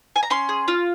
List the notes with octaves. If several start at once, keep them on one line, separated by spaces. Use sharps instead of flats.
G#5
A#5
C#4 C6
G#4
F4